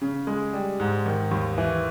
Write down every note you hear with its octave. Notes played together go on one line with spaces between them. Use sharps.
C#3
G#3
G3
G#2
D#3
D#2
E3